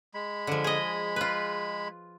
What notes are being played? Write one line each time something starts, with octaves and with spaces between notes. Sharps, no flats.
G#3 B5
D3 F3
G#4 D#5
F4 B4